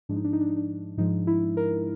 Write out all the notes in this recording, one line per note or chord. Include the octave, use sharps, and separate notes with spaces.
G#2 F3 G#3 D4
D#4
D4
D#4
D4
D#4
D4
G#2 F3 G#3 D#4
E4
A#4